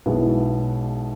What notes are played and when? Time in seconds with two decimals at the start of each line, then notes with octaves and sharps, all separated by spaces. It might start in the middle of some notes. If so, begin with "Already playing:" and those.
0.06 B1 B2 G#3 B3 E4